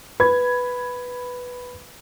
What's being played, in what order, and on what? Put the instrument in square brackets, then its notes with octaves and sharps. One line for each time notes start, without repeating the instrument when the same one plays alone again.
[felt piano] B4 B5 G#6